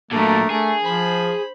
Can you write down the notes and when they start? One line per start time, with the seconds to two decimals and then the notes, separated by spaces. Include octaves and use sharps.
0.11 A#2 F#3 A3 D4 A#4
0.50 A3 G#4
0.84 F3 C5 B5